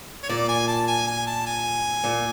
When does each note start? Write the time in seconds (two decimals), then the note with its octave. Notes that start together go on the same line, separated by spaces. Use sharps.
0.23 C#5
0.29 A#2 D5
0.49 G#5
0.68 A5
0.88 G#5
1.07 G#5
1.26 A5
1.46 G#5
2.04 A#2